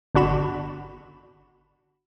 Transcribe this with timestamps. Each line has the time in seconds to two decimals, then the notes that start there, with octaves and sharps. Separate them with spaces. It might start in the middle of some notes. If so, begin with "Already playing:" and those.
0.15 G1 D4 F#4 B5 E7